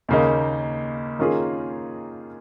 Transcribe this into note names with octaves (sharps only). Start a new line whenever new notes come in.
D#2 C#3 A#3 D#4
D#3 A#3 C#4 F4 G#4